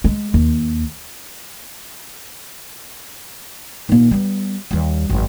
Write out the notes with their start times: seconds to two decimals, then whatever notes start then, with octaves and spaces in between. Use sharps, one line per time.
0.04 G#3
0.34 D#2
3.89 A#2 D#3
4.11 G3 B3
4.71 D#2 G3
5.10 G#1 F#2